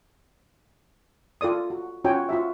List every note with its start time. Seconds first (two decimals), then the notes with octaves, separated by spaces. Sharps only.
1.41 F4 A4 D5 D#6
1.70 F#4
2.04 C#4 F4 F#4 C#5 G5 G#5
2.29 F4 F#4 E5